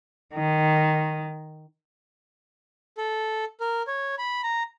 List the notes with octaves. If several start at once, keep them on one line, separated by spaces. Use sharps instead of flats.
D#3
A4
A#4
C#5
B5
A#5